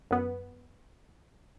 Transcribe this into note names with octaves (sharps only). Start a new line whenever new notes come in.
F#2 B3